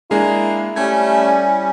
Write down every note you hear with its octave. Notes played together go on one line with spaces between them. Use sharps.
G#3 A#3 D4 E4 G#4
G3 A3 C#4 G#6